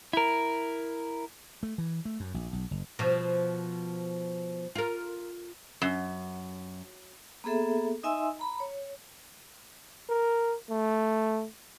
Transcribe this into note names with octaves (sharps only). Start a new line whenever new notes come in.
E4 A#4
A3
E3
A3
F#2
A#1
B1
F#1
B2 F3
F4 A#4
F#2
A#3 B3 G#4 A4 E5
D#4 D#5 E5 G#5 C6 E6
A#5 B5
C#5
A#4
A3